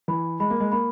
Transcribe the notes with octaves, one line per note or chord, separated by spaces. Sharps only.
E3 B5
G#3 B5
A#3
G#3
A#3 B5